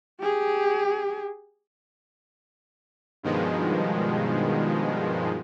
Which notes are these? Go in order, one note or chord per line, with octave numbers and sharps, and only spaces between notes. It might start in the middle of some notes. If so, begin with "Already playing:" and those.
G4 G#4
G2 B2 D#3 F3 G#3